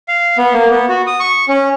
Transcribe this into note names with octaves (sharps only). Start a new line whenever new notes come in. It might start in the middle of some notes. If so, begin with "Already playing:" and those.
F5
B3
A#3
B3
F#4
D#6
C#6
C#4